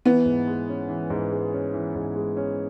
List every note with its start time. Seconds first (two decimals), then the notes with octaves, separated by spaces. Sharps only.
0.05 E3 B3
0.26 G#2
0.47 G#3
0.69 C#4
0.89 E3
1.10 G#2
1.32 G#3
1.53 C#4
1.74 E3
1.95 G#2
2.16 G#3
2.37 C#4